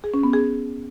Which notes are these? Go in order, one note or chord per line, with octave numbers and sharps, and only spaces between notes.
G#4
C#4
B3
G#4